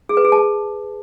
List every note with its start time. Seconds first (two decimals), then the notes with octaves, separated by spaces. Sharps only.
0.09 G#4
0.17 B4
0.25 G#4
0.32 A5